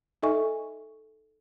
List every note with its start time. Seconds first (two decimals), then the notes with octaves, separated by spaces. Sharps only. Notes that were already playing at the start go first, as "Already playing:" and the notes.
0.23 D#4 A4 D#5 E5 G#5 C#6